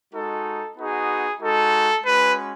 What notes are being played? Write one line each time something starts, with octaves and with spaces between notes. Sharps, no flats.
G#3 D#4 F#4 A4
B3 D#4 F#4 G#4
G#3 D#4 F#4 A4
G#3 C#4 F#4 B4